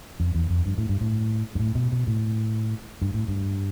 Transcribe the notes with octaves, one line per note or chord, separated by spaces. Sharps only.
F2
E2
F2
G2
A2
G2
A2
G2
A2
B2
B2
A2
G2
A2
G2